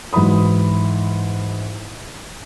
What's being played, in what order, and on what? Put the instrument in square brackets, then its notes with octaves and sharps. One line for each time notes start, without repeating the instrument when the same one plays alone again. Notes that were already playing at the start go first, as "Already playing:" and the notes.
[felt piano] G#2 E3 F#3 B5 D#6